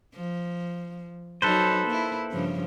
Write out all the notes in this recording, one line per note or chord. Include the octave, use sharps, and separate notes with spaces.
F3
F#3 D#4 A4 B4 C5
A#3 E4
G2 C#3 F3